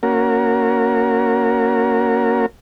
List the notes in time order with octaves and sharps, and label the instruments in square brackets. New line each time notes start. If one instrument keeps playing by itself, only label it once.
[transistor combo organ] A#3 C#4 F#4 A#4